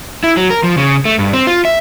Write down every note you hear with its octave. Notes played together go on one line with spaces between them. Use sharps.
E4
F#3
A#4
F3
C#3
A3
G2
C4
F4
E5